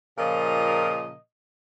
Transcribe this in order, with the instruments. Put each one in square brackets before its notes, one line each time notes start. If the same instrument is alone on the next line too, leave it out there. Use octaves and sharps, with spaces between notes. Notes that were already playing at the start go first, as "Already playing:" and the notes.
[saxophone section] A#2 C#3 F3 A#4 D#5